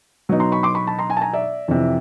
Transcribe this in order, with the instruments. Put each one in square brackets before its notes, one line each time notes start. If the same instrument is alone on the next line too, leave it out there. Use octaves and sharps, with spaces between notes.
[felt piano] B2 F#3 B3 D#4
A#5 C6
B5 C#6
C6 D6
B5 C#6
A5 B5
A#5 C6
G#5 A#5
A5
G#5 A#5
D5 E5
F2 C3 E3